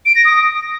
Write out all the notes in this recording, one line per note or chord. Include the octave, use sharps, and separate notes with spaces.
D7
A#6
D#6